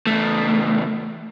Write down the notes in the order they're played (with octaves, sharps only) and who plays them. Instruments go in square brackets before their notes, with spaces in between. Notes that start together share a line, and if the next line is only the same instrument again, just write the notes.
[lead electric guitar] E2 A3